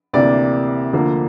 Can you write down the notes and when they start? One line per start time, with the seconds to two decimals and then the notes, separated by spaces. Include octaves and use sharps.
0.13 D2 C3 E3 A#3 D5
0.93 D2 D3 F3 A#3